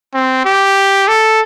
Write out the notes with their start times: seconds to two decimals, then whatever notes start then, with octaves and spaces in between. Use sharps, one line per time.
0.14 C4
0.45 G4
1.08 A4